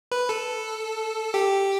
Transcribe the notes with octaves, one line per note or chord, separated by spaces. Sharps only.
B4
A4
G4